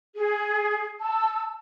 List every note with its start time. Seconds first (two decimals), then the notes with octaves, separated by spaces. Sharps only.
0.16 G#4
1.00 A5 E6